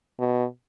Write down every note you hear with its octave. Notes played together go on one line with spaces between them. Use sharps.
B2